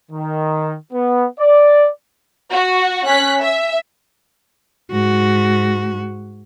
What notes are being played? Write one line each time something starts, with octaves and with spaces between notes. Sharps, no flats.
D#3
B3
D5
F#4
C#4 F#6 B6
E5
G#2 F#4